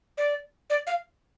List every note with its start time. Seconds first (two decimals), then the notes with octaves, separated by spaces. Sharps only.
0.18 D5
0.70 D5
0.87 F5